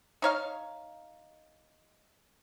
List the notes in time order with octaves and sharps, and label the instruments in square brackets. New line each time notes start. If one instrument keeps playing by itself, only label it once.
[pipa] D#4 C#5 F5